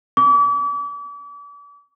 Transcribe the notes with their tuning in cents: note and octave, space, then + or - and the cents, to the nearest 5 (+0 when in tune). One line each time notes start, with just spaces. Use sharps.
D6 -40